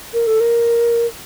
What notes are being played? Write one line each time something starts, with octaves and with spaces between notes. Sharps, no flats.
A#4
A4
A#4